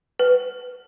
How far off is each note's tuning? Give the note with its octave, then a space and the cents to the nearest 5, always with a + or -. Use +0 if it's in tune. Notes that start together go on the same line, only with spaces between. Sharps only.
B4 +10